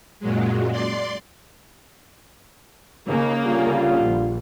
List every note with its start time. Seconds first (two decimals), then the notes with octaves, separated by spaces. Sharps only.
0.20 F#2 A#2 F#3 G#3
0.71 D5 C6
3.08 D#2 C#3 A#3
3.45 D3 G3 F4
4.01 A#1